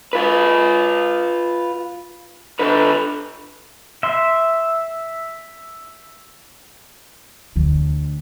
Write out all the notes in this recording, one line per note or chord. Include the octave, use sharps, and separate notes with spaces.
F4 B4
D3 B4
E5 C6
D2 D3